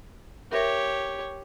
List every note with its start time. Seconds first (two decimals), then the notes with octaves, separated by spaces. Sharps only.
0.52 G4 A#4 C#5 E5 A#6